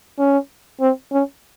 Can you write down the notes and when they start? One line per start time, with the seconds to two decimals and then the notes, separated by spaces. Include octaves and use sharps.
0.19 C#4
0.81 C4
1.12 C#4